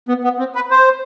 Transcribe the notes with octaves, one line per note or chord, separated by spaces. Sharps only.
B3
B3
C4
B4
C5